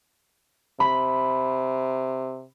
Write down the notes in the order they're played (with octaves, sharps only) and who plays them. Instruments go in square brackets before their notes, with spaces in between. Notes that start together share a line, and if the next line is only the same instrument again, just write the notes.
[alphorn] C3 [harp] B5